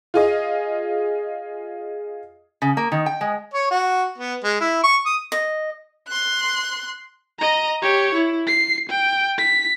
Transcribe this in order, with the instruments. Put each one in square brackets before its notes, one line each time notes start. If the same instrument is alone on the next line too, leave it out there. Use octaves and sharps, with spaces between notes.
[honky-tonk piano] F4 G#4 D#5
[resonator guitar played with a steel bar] C#3
A#3
D#3
G5
G#3
[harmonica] C#5
F#4
B3
G#3
E4
C#6
D#6
[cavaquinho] D#5
[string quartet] C6 F#6
[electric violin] D#5 A#5
G4 C#5
E4
C7
G5
B6